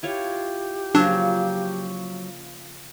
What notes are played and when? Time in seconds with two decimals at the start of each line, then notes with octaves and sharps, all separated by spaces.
0.03 E4 F4 G4 C#5
0.95 C#3 F3 F#3 A#3 D4